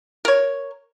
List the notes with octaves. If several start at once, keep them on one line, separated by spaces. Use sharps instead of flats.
A#4 C#5